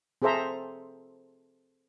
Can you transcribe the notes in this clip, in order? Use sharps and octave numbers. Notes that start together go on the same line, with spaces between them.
C4 G#4 A4 C5 E5 A#5